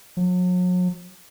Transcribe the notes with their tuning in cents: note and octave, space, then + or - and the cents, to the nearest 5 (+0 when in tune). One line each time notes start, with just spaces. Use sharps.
F#3 -40